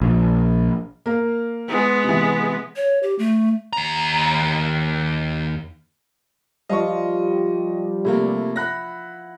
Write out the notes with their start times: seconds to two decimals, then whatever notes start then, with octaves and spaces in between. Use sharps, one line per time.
0.01 A#1
1.06 A#3 A#4 F5
1.68 G#3 B3
2.04 C3 E3
2.76 C#5
3.03 G4
3.19 A3
3.73 D#2 A#5
6.69 F3 G3 D#5 F5 C#6
8.05 C3 A3 A#3 E4
8.56 E5 F#5 B5 F#6 A#6